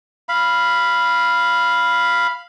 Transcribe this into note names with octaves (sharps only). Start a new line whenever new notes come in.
F5 B5